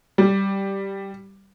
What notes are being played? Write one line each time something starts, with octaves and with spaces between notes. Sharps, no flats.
G3